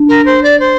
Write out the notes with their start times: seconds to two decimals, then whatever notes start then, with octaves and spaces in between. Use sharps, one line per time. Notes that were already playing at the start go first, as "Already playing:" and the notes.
Already playing: D4
0.09 A#4
0.26 C5
0.43 D5
0.60 C5